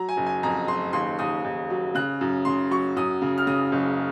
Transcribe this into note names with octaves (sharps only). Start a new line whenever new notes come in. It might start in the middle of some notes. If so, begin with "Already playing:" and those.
Already playing: F#3 A#5
G#5
F#1
G#5
F2 A#5
F#1 C6
D#2 C6
D#2 D#6
D#2
F#3
C#3 F#6
F#2
C#3 C6
F#3 C#6
F#2 D#6
C#3
F6
C#3 D#6
F#1